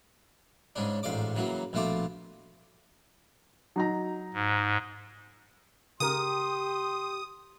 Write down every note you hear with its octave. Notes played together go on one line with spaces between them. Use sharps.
G#2 C#3 C#4 D4
A1 G#2 F4 D5 D6
C#3 E3 F#3 A#3
A#1 B2 A3 F4 D6
F#3 D#4 A#5
G#2
C#3 G4 A#4 C6 D#6